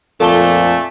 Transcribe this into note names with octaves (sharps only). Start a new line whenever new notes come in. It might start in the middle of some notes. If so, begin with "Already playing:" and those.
F2 A#2 A3 A4 A5 G7